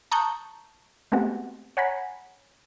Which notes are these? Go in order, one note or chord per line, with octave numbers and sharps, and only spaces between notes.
A5 A#5 C#6 D#6 F#6 G6
G#3 A3 B3 C4 F#4 G4
C#5 F#5 G#5 A#5 B5